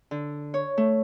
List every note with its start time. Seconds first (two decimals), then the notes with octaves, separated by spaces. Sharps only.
0.11 D3
0.54 C#5
0.78 A3